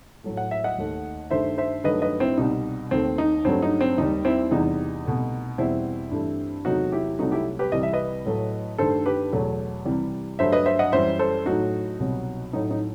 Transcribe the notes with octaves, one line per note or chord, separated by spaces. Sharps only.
A2 F#3 A3
F#5
E5
D#5 F#5
D#2 D#3 A3
G2 D#3 A3 C5 E5
C5 E5
G2 D#3 F#3 A3 B4 D#5
B4 D#5
C4 E4
C2 B2 G3 D#4
D#2 D#3 A3 C4
D#4
G2 F#3 A3 C4
D#4
C4
D#2 D#3 G3 D#4
C4 E4
E2 C3 E3 G3 D#4
C2 B2 A3
E2 B2 G3 C4 E4
G2 E3 A3
E2 C3 F#3 A3 D#4 F#4
E4 G4
C2 C3 F#3 A3 D#4 F#4
E4 G4
G4 B4
C2 C3 E3 G3 D#5
E5
B4 D#5
A2 F#3 A3
G2 D#3 A3 A4 C5
G4 B4
E2 B2 F#3 A3
C2 C3 E3 G3
G2 F#3 A3 C5 E5
B4 D#5
C5 E5
D#5 F#5
F#2 E3 G3 C5 E5
A4 C5
A2 F#3 A3 D#4 F#4
C2 B2 F#3
A2 F#3 A3 D#4
D#4